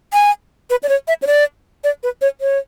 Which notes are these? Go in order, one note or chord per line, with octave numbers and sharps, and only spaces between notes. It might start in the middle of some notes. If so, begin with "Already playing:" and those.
G#5
B4
D5
C#5
E5
C#5
D5
D5
B4
C#5
C#5